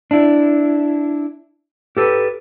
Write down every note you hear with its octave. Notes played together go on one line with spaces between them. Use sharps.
D4 E4
G4 A4 B4